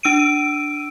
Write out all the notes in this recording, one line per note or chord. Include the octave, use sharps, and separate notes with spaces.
D4 E6 D7 D#7